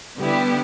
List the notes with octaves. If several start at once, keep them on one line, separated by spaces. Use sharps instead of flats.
D3 G3 B3 E4 G4